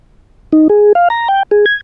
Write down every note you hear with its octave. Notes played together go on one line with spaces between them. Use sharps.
D#4
G#4
F5
A#5
G5
G#4
G#6